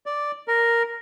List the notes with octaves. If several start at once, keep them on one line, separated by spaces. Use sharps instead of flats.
D5
A#4